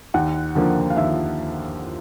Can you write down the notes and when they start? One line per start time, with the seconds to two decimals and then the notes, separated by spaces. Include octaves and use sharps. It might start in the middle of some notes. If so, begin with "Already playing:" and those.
0.14 D#2 F#5
0.55 D3 F3 A#3
0.90 F5
0.96 D#2 E5